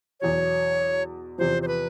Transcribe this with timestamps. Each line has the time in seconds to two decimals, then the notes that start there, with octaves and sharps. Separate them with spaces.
0.21 E2 B2 F#3 C#5
1.38 E2 C3 F3 C5
1.62 C5
1.68 B4